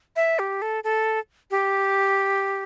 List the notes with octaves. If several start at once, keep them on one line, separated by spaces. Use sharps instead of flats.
E5
G4
A4
A4
G4